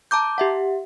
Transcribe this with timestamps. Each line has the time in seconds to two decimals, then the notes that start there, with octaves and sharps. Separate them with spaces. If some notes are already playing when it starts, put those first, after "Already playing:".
0.11 A5 A#5 D6 G6
0.38 G4 E5 F#5